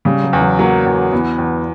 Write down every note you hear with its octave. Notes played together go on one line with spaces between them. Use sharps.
C#3 G3
F#3
E2
F#3
F#3 A#3
E2
E3 B3
E2